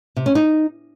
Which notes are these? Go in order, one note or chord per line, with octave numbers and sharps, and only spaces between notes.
C3
C#4
D#4